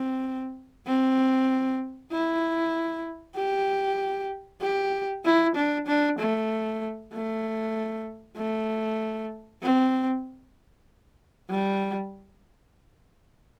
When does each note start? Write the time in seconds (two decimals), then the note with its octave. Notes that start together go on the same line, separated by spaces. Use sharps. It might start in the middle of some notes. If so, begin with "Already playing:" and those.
Already playing: C4
0.87 C4
2.12 E4
3.36 G4
4.61 G4
5.25 E4
5.56 D4
5.87 D4
6.19 A3
7.13 A3
8.37 A3
9.62 C4
11.50 G3